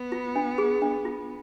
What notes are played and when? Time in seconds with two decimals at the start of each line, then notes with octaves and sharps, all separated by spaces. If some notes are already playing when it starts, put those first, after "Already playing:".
Already playing: B3
0.12 F4
0.36 D4
0.58 G#4
0.82 D4
1.05 F4